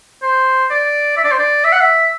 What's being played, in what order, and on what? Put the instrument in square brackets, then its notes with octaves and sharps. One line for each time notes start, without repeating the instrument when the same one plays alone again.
[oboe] C5
D5
E5
D5
C5
D5
E5
F#5
E5